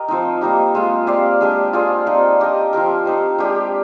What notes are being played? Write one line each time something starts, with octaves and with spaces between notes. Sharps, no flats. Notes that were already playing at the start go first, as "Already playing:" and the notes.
Already playing: G4 A#4 D#5
F3 C4 D#4
G3 A#3 D#4 G4
G#3 C4 F4
C4 G4 D5 F5
G#3 D4 G4
C4 F4 G#4 D5
C4 D#4 G4 D5
D4 G4 A#4 D#5
F3 C4 G4 A#4
C4 D#4 G4 C5
G#3 D4 G4 D5